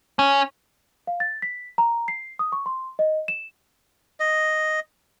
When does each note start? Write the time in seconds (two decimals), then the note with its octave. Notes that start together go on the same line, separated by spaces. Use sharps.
0.19 C#4
1.07 F5
1.20 A6
1.42 B6
1.78 A#5
2.08 C7
2.39 D#6
2.52 C#6
2.66 C6
2.99 D#5
3.28 E7
4.20 D#5